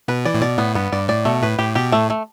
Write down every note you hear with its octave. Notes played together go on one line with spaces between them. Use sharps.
B2 B4
E3 D5
A2
B2 D5
A2 B3
G2 B3
G2 D5
A2 D5
B2 A3
A2 B4
A2 G4
B2 G4
A2 A3
A3